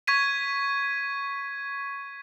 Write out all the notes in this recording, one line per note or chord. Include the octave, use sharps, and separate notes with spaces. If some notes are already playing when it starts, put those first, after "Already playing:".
C#6 G#6 B6 D#7